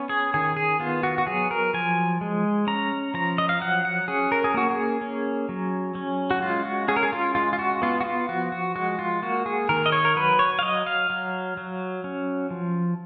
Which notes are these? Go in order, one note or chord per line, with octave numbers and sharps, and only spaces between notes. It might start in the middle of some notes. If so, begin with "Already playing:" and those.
Already playing: B3 C#4
G#4
D#3 G#4
G#4
B3 F4
F#4
F#4
F#3 G#4
A#4
F3 G#5
G#3
C#4 A#5
F3 A#5
D#5
F5
F#3 F#5
F#5
C#4 G#4
A#4
G#4
A#3 F#4
G#4
C#4
F#3
C#4
F#4
G#3 F4
F#4
C#4 G#4
A#4
G#4
F4
G#3 F4
F4
F#4
B3 F4
F#4
F4
F3 F#4
F#4
G#3 F#4
F4
A#3 F#4
G#4
D#3 A#4
D#5
C#5
A#4
F#3 B4
C#5
F5
F#3 D#5
F5
F#3
F#3
C#4
F3